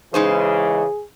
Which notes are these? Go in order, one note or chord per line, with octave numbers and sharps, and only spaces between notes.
C#3 E3 G#3 D#4 G#4 C5